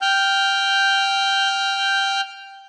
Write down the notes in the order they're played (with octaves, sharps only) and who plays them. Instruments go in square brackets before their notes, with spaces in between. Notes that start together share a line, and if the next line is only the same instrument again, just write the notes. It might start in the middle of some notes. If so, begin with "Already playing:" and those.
[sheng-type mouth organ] G5 F6 G6